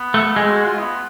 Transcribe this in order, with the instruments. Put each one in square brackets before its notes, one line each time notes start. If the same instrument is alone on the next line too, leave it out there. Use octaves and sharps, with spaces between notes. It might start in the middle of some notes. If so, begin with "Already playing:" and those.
Already playing: [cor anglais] B3
[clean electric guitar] A3
[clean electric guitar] G#3 [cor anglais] C4
[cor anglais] F#4
F4
B3